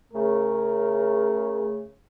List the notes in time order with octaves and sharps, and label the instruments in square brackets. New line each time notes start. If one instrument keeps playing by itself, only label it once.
[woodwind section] C#3 A3 [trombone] A#4